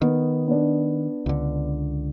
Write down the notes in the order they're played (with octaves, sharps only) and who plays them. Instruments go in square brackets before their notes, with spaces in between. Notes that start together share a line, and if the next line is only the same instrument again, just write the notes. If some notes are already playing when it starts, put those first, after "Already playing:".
[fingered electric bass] D#3 [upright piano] B3
[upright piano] B3 D4
[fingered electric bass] C#2 D3